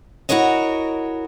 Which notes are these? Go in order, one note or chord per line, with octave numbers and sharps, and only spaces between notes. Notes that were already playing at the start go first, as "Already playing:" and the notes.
E4 F#4 A#4 C#5 D#5